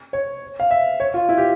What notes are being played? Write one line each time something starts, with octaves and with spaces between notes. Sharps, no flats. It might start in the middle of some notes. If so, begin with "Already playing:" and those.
C#5
F5
E5
C#5
F4
E4
G4